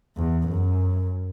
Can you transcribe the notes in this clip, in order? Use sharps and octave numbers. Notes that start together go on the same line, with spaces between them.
E2
F#2